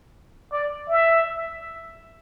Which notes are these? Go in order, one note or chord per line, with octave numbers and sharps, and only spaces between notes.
D5
E5